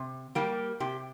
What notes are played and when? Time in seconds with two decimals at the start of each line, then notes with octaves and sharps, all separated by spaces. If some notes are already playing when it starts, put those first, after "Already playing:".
Already playing: C3
0.35 G3 A#3 G4
0.80 C3 G4